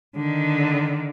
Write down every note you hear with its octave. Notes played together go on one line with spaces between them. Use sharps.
D3 D#3